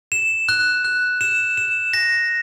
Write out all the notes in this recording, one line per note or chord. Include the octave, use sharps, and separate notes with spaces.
E7
F#6
F#6
E7
E7
A#6